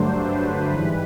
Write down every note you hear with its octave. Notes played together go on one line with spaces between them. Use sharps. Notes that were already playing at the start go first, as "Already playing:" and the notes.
Already playing: G2 D3 F#3 A3 D4 C5
B4
G#2 E3 G3